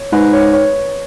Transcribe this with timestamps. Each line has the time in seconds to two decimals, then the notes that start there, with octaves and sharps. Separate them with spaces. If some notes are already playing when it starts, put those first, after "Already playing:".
Already playing: C#5
0.12 G#2 B4
0.33 C#5
0.53 C#5